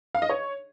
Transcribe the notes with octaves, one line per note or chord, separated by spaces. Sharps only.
F5
D#5
C#5